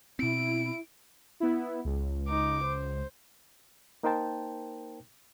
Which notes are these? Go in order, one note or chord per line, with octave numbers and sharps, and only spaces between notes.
B2 C4 E4 D7
B3 E4
C#2
D#4 D6
C5
A#3 D#4 A#4 C5 G5 A5